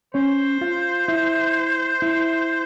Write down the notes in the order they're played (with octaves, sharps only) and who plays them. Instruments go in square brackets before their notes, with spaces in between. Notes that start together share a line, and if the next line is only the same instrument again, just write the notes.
[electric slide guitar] C#4 C#5 [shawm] C5
[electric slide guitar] F4 F5
E4 E5
E4 E5